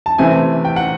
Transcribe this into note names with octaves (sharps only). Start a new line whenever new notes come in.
A5
C3 E3 A3 C4 G#5
G5
F#5